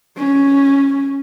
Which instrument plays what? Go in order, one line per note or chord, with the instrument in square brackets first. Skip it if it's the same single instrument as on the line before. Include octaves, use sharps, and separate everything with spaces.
[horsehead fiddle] C#4